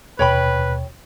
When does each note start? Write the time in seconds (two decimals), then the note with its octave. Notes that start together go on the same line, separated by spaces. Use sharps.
0.19 D#2 B2 B4 C#5 G5 B5